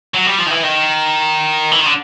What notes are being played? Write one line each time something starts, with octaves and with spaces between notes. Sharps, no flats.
F#3
G3
F3
D#3
E3
D#3
E3
D#3
D3